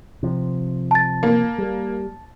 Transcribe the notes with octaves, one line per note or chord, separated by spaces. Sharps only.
C3 F3
A5 A6
A#3
G3